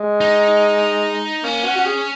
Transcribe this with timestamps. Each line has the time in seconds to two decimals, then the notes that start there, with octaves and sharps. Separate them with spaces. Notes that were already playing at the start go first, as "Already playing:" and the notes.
Already playing: G#3
0.21 D#4
1.43 A#3 C#4
1.64 F#4
1.76 F#4
1.85 G#4